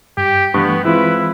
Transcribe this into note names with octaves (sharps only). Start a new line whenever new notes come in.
G2 G4
G2 E3 A3 B3 C#6
E3 G#3 C4 E4 F4 B4